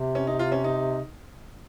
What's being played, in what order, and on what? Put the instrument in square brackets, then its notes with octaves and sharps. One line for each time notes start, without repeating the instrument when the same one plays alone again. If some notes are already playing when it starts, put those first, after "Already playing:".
Already playing: [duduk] C3
[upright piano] C#4
D#4
F4
C#4
D#4